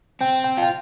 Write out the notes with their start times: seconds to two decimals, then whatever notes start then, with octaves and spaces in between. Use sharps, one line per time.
0.21 C4 G5
0.44 G5
0.58 F4
0.63 G5